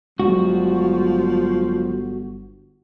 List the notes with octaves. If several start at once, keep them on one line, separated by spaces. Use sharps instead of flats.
G1 F3 F#3 G#3 F#4